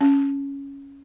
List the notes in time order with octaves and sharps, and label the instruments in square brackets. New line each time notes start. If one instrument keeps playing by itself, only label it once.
[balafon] C#4